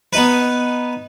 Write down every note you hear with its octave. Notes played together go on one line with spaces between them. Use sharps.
B3 D#4 B4